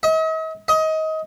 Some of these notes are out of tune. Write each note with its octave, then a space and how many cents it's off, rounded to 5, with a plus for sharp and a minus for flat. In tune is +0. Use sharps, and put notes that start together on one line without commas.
D#5 +45
D#5 +25